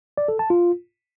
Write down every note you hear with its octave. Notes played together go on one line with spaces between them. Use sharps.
D5
A4
A5
F4